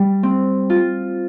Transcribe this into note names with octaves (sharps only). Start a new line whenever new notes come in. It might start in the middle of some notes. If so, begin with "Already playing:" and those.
Already playing: G3
C4
F4